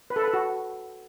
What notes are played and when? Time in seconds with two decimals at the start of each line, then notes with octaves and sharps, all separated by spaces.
0.10 B4
0.16 A4
0.22 B4
0.28 A4
0.34 F#4